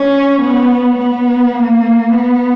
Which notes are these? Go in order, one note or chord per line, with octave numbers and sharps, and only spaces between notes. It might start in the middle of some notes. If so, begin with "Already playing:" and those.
Already playing: C#4
B3
B3
A#3
B3